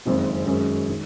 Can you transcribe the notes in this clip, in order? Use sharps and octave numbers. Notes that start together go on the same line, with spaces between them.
F#1 F2 D#3 G#3 C4
F#2 D#3 G#3 C#4 G#4
D#3